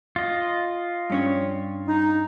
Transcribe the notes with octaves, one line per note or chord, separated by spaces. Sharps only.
F4 D#5
G2 C#4 C#5
D#4